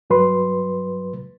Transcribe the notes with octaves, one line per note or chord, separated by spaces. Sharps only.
G2 F#3 B4 C6